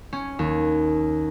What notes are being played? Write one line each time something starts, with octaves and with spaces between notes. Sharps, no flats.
C#4
D#2